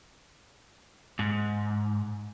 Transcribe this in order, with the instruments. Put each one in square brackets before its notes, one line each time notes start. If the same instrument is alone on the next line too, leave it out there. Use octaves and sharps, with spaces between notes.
[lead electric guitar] G#2